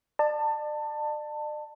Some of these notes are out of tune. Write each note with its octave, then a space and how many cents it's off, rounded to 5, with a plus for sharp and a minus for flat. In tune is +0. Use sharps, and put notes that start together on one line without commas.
D5 +40 A5 +20